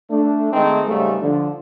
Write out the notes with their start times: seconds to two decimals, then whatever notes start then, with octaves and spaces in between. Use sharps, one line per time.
0.10 A3 D4
0.52 D#3 G#3 A3 C4 D#4 A4
0.87 G#2 C#3 G3 A3
1.21 D3 F3